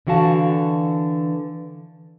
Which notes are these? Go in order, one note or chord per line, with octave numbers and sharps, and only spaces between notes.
D3 E3 F#4 F5 A5